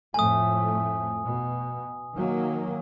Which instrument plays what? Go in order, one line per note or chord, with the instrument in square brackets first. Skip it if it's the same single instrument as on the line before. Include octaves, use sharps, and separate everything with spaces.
[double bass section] F2 A2 A3 [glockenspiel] G#5 D#6
[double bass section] B2
D#3 F#3 A#3